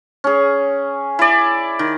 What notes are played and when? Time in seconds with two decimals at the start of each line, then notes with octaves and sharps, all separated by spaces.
0.24 C#4 G#4
1.19 E4 D5
1.79 D#3